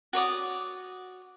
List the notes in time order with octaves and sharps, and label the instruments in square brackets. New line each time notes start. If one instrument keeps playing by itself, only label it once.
[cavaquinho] F#4 C#5 D5 D#6